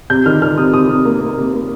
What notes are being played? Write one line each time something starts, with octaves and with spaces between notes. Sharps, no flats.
C3 G6
D#3 F6
D#3 F6
C3 D#6
C3 D#6
C3
A#3
A#3
C3
A#3